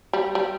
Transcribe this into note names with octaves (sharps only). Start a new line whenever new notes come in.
G3
G3